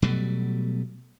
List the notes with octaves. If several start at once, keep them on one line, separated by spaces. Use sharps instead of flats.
B2 F#3 G3 A3